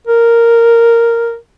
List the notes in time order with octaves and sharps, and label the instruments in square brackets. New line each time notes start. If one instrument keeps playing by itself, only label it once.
[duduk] A#4